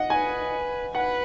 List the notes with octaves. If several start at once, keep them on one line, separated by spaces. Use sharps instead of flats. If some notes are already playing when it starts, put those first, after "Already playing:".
Already playing: D#5 F#5
B4 G#5
B4 F#5